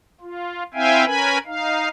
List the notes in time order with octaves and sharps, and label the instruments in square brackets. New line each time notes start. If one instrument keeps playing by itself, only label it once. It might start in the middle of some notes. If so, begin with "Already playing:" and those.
[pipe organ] F4
C4 E4 E5 F5 G5 G#5
C#4 A#4 B4 G#5 B5
D#4 F5